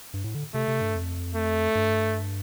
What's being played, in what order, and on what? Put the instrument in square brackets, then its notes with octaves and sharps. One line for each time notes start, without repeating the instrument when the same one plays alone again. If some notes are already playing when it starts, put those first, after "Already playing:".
[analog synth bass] G2
A2
D3
[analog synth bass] C3 [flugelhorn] A3
[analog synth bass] C3
G2
F2
[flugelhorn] A3
[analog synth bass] G2